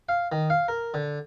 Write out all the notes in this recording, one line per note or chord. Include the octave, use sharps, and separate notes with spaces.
F5
D#3
F5
A#4
D3